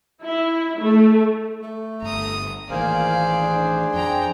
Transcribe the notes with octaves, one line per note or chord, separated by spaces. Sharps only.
E4
A3
A3
G1 A#5 D#6
A1 D#3 E3 A#3 G#4 C5 D5 F5
D4
F2 F3 G5 A#5